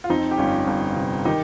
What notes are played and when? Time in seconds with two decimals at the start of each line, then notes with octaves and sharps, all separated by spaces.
0.04 F4
0.09 F2 C4 D#4
0.31 G4
0.38 G1 C#4 F4
0.67 G1
0.96 C3
1.25 D#3 D#4 G4